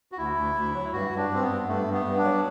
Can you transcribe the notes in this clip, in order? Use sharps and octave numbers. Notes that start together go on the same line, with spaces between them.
F#4
D2 E4
D2
D2
F#3
G2 F#4
G2
D4
G2 C4
B3
G2
G2 A3
G2
B3
G2
D4
F#3